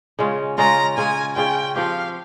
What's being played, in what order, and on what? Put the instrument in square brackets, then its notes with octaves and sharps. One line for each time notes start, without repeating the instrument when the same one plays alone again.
[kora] C#3 G#3 C#4 F4
[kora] C#3 G#3 C#4 F4 [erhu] A#5
[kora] C#3 G#3 C#4 F4 [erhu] G#5
[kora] C#3 G#3 C#4 F4 [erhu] G5
[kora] F3 C4 G4 [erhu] F5